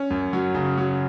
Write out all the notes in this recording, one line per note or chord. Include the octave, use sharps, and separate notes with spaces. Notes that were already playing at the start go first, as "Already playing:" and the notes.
Already playing: C#4
F#2
F#3
C#3
F#3